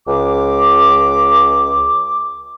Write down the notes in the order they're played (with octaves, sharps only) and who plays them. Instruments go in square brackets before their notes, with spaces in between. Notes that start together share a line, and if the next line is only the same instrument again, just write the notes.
[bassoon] C#2 [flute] D6